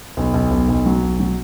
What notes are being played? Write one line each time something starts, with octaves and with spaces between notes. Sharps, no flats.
B1
B1
B1
B1
F#3
B1
F#3